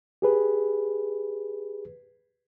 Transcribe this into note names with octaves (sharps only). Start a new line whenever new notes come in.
G4 G#4 B4